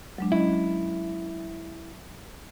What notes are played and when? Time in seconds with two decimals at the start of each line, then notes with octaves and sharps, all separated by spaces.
0.18 F#3 G#3 D4
0.32 C#4 E4 D#5